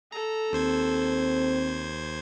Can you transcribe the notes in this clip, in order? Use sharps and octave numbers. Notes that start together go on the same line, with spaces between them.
A4 A#5
D#2 C4 C5 G#6